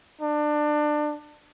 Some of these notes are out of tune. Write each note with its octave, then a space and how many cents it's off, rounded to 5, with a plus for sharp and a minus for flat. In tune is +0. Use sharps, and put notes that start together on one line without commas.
D4 +25